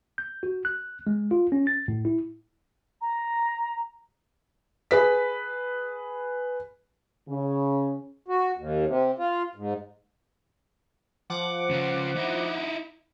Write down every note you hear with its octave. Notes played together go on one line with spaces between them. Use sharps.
G6
F#4
F#6
G#3
F4
C#4
A6
A2
E4
A#5
G#4 B4 B6
C#3
F#4
D#2
C3
F4
G#2
F3 F#5 D6
C#3 F4
D#4 E4